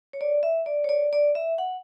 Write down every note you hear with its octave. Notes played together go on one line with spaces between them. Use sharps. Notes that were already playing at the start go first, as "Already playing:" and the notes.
C#5
D5
E5
D5
C#5
D5
D5
E5
F#5